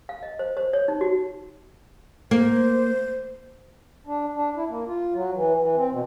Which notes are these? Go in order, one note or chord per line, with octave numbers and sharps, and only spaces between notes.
F5
D#5
C5
C5
C#5
D#4
F#4
A#3 C5
D4
D4
E4
A#3
F4
F#3
E3
E3
C4
B2